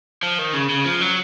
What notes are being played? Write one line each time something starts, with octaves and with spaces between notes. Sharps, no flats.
F3
D#3
C#3
C#3
F3
F#3